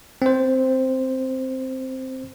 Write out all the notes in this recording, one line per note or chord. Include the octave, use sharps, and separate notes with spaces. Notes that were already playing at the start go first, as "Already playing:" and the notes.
C4 C5